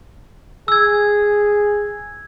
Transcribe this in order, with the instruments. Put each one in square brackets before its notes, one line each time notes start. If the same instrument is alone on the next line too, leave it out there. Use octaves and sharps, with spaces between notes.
[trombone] G#4 [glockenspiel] E6 G#6